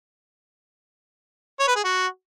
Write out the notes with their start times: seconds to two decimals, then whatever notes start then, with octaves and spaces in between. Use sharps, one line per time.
1.59 C#5
1.68 B4
1.76 G#4
1.84 F#4